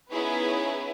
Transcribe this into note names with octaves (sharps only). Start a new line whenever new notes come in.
B3 C#4 D#4 E4 G#4 B4